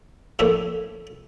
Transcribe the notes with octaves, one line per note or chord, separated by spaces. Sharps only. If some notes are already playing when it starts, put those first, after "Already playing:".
F2 A2 A3 A#3 D4 E4